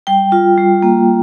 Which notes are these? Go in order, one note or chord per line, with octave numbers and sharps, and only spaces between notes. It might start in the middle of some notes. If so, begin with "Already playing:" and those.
G3 G5
F4
G3
A#3